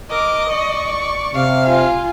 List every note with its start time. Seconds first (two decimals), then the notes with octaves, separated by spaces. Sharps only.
0.10 A#4 D#5 D6
0.50 D5 C#6
1.35 C3 F5
1.66 F4 G#5